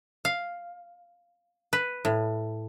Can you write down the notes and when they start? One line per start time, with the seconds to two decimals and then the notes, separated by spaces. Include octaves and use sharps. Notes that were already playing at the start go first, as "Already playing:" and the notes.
0.25 F5
1.73 B4
2.05 A2